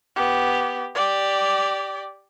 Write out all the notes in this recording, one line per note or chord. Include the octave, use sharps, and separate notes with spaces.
B3 G4
G4 D5